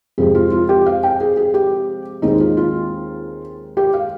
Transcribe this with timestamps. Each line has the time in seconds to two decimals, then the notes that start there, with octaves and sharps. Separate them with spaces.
0.18 F2 C3 F3 G#3 C4 G#4
0.35 F4
0.51 F4
0.69 G4
0.86 F5
1.03 G5
1.20 G#4
1.37 G#4
1.54 G4
2.22 D#2 D#3 G#3 C4 D#4
2.40 F4
2.57 F4
3.77 G4
3.94 F5